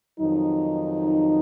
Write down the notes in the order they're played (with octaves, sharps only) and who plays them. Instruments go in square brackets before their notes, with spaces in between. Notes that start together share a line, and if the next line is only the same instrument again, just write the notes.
[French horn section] F2 D#3 F#3 D#4